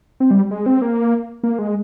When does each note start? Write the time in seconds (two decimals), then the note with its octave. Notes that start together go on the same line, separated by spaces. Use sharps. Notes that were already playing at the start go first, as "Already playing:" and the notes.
0.20 C4
0.31 G3
0.51 G#3
0.66 C4
0.82 A#3
1.43 A#3
1.59 G#3